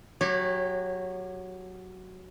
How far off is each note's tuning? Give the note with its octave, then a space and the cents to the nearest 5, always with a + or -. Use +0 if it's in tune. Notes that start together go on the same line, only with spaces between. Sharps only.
F#3 +0 G4 +20 C#5 -20